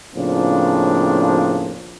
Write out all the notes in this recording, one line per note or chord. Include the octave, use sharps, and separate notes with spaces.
A2 C#3 F3 A#3 C4 D4